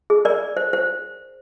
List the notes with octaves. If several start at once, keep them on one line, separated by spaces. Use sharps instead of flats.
G#4
A#4 D5
C5
C5